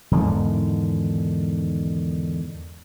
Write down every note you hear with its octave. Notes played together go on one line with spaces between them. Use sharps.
E2 G#2 D3 D#3